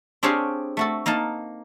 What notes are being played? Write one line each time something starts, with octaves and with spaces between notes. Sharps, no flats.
C4 D4 G4 G#4 C#5 F5
A3 F#4 A4
A#3 D#4 A#4 A5